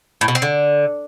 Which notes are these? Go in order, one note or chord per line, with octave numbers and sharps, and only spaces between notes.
A2
B2
C4
D3